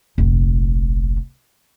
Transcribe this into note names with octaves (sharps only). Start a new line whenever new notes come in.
F1 A#1